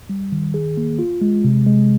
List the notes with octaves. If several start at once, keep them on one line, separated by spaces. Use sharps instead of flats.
G3
D#3
G#4
A#3
F4
G#3
C3
G#3